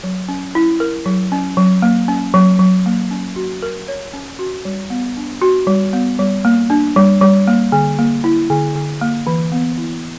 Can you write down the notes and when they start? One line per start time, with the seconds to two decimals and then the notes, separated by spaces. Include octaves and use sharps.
0.04 F#3
0.29 C#4
0.55 E4
0.80 A#4
1.06 F#3
1.32 C#4
1.57 F#3
1.82 A#3
2.08 C#4
2.34 F#3
2.59 F#3
2.86 A#3
3.11 C#4
3.36 F#4
3.62 A#4
3.88 C#5
4.14 C#4
4.39 F#4
4.65 G3
4.90 B3
5.17 D4
5.42 F#4
5.67 G3
5.93 B3
6.19 G3
6.45 A#3
6.70 D4
6.96 G3
7.21 G3
7.48 A#3
7.72 D3
7.98 A#3
8.24 E4
8.50 D3
8.75 D3
9.01 A#3
9.27 E3
9.52 B3
9.78 E4